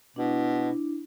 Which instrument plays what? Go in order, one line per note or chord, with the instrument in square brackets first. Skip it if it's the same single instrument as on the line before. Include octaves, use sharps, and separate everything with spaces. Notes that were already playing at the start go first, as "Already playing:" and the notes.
[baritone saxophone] B2 [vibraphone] D4 E4